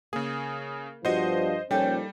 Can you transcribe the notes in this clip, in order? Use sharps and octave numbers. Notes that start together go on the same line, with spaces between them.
C#3 A#3 G#4
G2 F3 G3 B3 F#4 C5 D#5
A#2 F3 G3 A#3 C#4 D#4 A4 G5